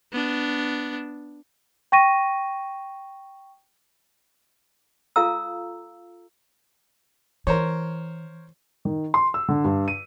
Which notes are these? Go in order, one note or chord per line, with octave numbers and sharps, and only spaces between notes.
B3 D4
G5 C#6 A#6 D#7
F4 A4 F5 A#5 E6
E3 A#4 C5 C#5
D#3
C6
E6
D3
G2
D#7